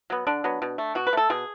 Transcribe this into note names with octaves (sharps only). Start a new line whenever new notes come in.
F#3 B3
D3 D4
F#3 B3
B2
A3
B2 F#4
B4
A3 A4
B2 G#4